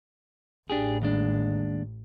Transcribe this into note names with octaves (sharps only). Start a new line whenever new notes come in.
A1 D4 G4 G#4
D#2 G#3 D4